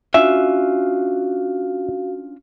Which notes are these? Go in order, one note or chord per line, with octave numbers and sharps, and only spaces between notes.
C#4 D4 F4 F#4 E5 F5